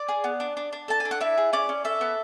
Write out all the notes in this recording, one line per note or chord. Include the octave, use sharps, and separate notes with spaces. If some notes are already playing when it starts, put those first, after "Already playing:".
Already playing: D5
G#4
B3
D4
D4
D4
A4 A5
G#5
D4
F#5
E4 E5
G#4
C#4 D5
C#4
A4 E5
B3